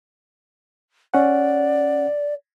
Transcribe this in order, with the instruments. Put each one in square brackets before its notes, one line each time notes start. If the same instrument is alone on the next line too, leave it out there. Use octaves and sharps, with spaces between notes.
[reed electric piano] C#4 F#5 [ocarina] D5